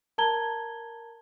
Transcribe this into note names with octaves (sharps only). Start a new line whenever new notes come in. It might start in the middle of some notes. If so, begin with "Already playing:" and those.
A#4 A5 A#5 G#6 G7